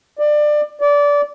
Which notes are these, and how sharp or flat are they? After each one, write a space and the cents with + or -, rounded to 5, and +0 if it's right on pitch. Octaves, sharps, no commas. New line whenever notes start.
D5 +25
D5 -20